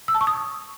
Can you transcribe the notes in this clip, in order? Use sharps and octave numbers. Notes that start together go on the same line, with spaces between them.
E6
A5
C#6
D#6